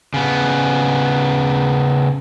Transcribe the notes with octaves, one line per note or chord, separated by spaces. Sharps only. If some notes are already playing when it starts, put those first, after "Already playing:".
C#3 B3